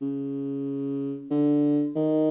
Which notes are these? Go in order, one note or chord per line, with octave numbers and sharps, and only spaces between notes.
C#3
D3
D#3